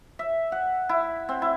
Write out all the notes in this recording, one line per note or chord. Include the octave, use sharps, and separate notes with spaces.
E5
F#5
E4
C4
E4